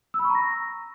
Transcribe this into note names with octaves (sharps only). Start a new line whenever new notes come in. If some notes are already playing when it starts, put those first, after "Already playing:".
E6
B5
C#6
A#5
A#6